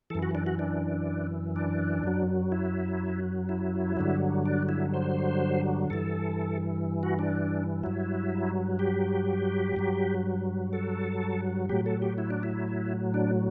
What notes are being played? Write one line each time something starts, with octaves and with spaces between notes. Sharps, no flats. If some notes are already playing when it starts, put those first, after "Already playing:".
F#2 E3 A4
F#4
D4
F#4
D4
D4
F#2 F#3
E4
E4
G2 D3 F#3
D4
E4
C5
G2 E3 A4
F#4
D4
G2 F#3 E4
G4
G2 F#3
A4
A2 F#3 G4
A4
G4
E4
D4
E4
D4